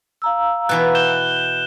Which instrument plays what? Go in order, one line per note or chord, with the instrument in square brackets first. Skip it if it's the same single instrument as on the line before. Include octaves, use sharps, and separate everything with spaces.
[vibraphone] F5 A#5 E6
[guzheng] B2 E3 B3 [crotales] F#6
[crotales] G6 E7 G7